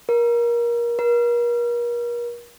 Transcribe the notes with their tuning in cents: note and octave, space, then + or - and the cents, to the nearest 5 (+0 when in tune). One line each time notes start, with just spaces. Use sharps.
A#4 +25
A#4 +40